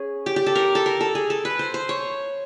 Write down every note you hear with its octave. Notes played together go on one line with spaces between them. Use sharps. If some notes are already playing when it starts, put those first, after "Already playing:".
Already playing: C#4 G#4
G4
G4
A4
A#4
A4
A#4
A4
G#4
A4
B4
C5
C5
C#5